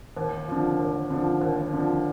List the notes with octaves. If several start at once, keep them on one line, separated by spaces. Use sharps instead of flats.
D#2
D3 F3
D#2
D3 F3
D#2
D3 F3